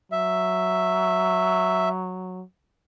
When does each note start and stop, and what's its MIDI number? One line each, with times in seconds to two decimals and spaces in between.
0.12 2.43 54
0.12 1.89 76